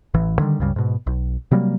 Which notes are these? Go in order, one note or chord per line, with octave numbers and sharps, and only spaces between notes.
A1 E3
D3 D#3 G3
C#2 G2 C#3 G3
G#2 B2
B1
C3 F#3 G3 A#3